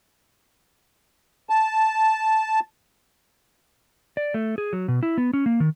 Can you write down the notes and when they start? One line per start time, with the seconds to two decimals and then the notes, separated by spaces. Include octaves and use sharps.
1.49 A5
4.17 D5
4.34 A3
4.58 G#4
4.73 F#3
4.88 B2
5.03 E4
5.18 B3
5.33 C#4
5.46 A#3
5.60 D#3